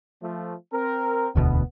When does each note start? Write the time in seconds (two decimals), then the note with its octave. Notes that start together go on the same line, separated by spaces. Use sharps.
0.22 F3 A3
0.73 C4 A#4
1.35 E1 D2 B2 B3